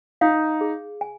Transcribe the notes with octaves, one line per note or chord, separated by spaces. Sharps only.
D#4 F5
G#4
G#5